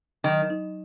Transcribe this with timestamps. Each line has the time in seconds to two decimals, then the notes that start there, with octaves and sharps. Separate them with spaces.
0.24 D#3 F#3
0.50 D#4